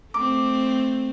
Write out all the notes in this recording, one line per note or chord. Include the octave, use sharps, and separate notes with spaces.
A3 C4 D6